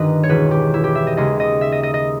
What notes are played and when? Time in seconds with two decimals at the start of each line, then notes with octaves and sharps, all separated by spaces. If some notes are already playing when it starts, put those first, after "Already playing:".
Already playing: G1 G2 D#3 B4 D#5
0.23 C#5
0.29 E1 E2 B2 B4
0.51 G4
0.74 E4
0.84 G4
0.95 E5
1.07 D#5
1.17 D#2 C#3 G#3 D#5
1.40 D#5
1.61 E5
1.72 D#5
1.83 D#5
1.94 D#5